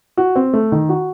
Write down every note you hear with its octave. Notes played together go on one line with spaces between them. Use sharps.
F#4
C4
A3
D#3
F#4